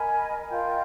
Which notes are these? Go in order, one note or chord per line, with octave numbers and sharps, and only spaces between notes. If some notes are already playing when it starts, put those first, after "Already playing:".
Already playing: A#4 D#5 G#5 B5
F4 A#4 D#5 G5